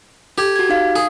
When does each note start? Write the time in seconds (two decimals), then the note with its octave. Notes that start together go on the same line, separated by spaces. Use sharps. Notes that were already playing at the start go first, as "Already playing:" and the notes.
0.38 G4 A4 G#6
0.56 F#4 G#6
0.69 D#4 F5
0.96 G#4